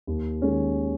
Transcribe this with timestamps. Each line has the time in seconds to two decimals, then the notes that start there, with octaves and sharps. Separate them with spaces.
0.07 D#2
0.42 D#3 G#3 C#4